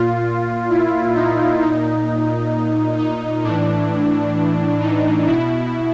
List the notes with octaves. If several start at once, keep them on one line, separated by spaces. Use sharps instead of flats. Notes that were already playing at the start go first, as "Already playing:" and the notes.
Already playing: A#2 F4
E4
D#4
A#2 D#4
D#4
A2 E3 D4
D#4
B2 E4